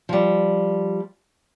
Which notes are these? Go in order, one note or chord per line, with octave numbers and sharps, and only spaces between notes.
F3 G3